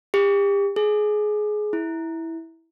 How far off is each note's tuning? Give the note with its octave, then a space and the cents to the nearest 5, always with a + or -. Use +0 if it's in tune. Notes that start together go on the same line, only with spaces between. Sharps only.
G4 +35
G#4 +20
E4 -10